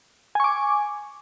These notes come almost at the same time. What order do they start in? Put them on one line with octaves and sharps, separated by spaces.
G#5 C#6 D6